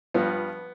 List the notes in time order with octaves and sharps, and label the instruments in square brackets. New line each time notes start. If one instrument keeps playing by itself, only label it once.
[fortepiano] G2 F3 B3